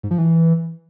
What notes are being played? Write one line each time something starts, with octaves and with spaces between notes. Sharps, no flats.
G#2
F3
E3